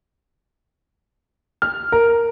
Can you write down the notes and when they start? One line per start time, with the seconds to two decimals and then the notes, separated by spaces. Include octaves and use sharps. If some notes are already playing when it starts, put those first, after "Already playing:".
1.62 F6
1.92 A#4